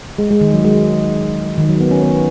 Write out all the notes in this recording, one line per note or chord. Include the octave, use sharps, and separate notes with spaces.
G#3
G#3
D#3
F#3
G#3
D#3
F#3
B3
C#4
B3